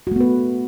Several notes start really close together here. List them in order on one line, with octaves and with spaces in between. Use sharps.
F#4 A3 B3 B4